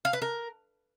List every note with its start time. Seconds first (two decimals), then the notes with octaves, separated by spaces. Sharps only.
0.05 F5
0.13 B4
0.22 A#4